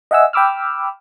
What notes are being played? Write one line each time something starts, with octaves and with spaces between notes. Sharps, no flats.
D#5 E5 F#5 G#5 E6
G5 B5 D6 E6 F6